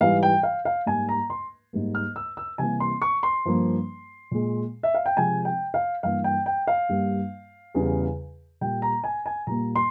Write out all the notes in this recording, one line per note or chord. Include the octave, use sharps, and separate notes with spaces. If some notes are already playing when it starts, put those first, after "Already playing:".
G#2 E3 G3 F5
G5
F5
F5
G#2 G3 A#3 G#5
A#5
C6
G#2 G3 A#3
F6
E6
E6
C3 E3 G3 A#3 G#5
C6
C#6
C6
G2 F3 A#3
A#2 G#3
E5
F5
G5
C3 F3 G#3 G#5
G5
F5
G2 E3 A#3 F5
G5
G5
F5
G2 G3 A#3
E2 C#3 G3
A#2 G3 A#3 G5
A#5
G#5
G#5
A#2 G3 A#3 A#5
C6